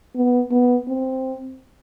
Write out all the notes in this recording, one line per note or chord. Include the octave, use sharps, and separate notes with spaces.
B3
B3
C4